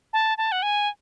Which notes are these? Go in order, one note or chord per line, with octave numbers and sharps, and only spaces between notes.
A5
A5
F#5
G#5